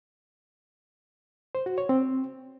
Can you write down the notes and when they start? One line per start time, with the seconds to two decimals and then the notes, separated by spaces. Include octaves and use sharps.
1.55 C5
1.66 F#4
1.78 C#5
1.89 C4